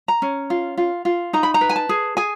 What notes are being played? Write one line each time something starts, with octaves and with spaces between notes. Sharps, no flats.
A#5
C#4
F4
F4
F4
D#4 A#5
B5
A#5
B4
G#5
A5
G#4
G#4 G#5